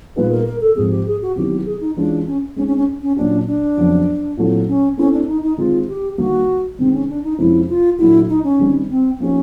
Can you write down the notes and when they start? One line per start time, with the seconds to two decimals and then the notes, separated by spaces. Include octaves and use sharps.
0.16 A#2 G3 B3 D#4 G#4 B4
0.31 A#4
0.46 A#4
0.61 A4
0.76 G#2 F3 G#3 C4 G#4
0.91 G4
1.06 G#4
1.22 F#4
1.36 C3 D#3 F#3 B3 E4 G4
1.66 G#4
1.81 D#4
1.97 E3 G#3 C#4 D4 F4
2.27 C#4
2.56 G#3 C4 C#4 D#4
2.67 C#4
2.77 C#4
3.02 C#4
3.16 A#2 F#3 A#3 C#4 D4 F#4
3.47 D4
3.77 F2 C#3 F#3 B3
4.37 A#2 F#3 A3 C4 E4
4.68 C#4
4.97 A3 C4 C#4 E4
5.13 D4
5.28 D#4
5.43 D#4
5.57 D#3 G#3 C4 F4
5.88 G4
6.18 D#3 G3 A#3 F#4
6.78 C3 D#3 G#3 C4
6.94 C#4
7.09 D4
7.24 D#4
7.38 F2 C3 F3 G#3 C#4 E4
7.69 F4
7.98 A#2 F#3 A3 D4 E4 F#4
8.29 D#4
8.44 C#4
8.59 D#3 G3 C4 D#4
8.90 C4
9.20 F3 A#3 C#4 D#4 G4